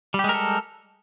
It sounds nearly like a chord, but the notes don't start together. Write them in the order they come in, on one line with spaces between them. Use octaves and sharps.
G3 G4 G#3 A#4 A4